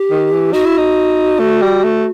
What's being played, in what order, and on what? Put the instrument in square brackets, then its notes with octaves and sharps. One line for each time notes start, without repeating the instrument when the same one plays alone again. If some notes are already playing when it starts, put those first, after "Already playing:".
Already playing: [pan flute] G4
[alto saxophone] D#3
E3
[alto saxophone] D#4 [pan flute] F#4
[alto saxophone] E4
D#4
A3
G3
A3